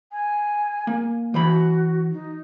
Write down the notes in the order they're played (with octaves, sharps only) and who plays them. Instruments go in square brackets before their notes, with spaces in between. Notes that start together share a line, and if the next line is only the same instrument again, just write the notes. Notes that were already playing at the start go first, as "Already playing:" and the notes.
[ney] G#5
[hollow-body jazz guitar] A#3
[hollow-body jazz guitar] E3 C5 B5 [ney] F#4
[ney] D#4